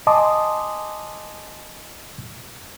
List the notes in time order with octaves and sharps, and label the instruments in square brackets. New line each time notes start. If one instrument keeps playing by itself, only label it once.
[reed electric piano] D#5 G#5 A5 C6 D6 D#6